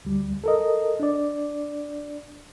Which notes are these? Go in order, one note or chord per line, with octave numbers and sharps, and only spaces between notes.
D2 G3
A4 A#4 D#5
D4 D5